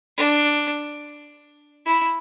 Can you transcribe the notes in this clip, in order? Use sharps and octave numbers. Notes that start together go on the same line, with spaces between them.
D4
E4